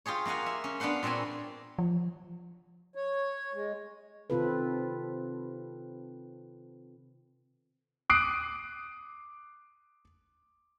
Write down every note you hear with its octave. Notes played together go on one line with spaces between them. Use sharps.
F4 G4 G#4 C#5
A#3 F4 F5 F#5 G#5
E5
C#4
B3 D4 F5 F#5 C6
A#2 C4 A4 C#5 G#5
F3
C#5
G#3
C3 D#3 C4 F4 A4 B4
D6 D#6 F#6 C7 D7